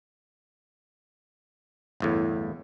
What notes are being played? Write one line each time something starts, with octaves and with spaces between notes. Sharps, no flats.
G1 E2 A2